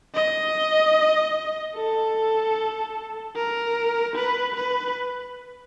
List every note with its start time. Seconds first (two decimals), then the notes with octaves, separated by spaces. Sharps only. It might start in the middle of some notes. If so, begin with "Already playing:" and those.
0.15 D#5
1.75 A4
3.36 A#4
4.16 B4
4.56 B4